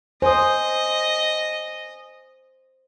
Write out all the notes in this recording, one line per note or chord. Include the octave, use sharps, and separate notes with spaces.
C5 D#5 G#5 D#6